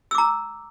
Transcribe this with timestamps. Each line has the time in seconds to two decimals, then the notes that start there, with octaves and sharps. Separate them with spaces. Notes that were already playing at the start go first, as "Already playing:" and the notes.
0.11 E6
0.15 D6
0.18 A#5